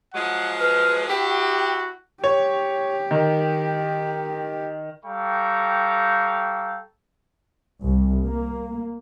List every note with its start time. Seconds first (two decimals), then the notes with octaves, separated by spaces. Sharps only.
0.14 F3 F#3 G#3 F#5
0.60 B4 F6
1.08 D4 E4 F#4 G4 G5
2.24 G4 C#5
3.11 D#3
5.04 G3 A4 F5 G5 A#5 C#6
7.84 C2
8.24 A#3